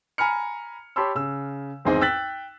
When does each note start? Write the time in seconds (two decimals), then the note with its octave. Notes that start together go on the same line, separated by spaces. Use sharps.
0.18 G#5 A#5 B5 F6 C#7
0.96 G4 C#5 A5 B5 C6 E6
1.15 C#3 E6
1.85 G#1 E2 G#2 C4 G#4 D#5
2.01 G5 E6 F#6 A6 B6 F#7